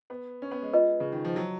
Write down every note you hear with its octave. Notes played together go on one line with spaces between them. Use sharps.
B3
C#4
B3
G#3
F4 B4 D#5
C#3
D#3
F3
F#3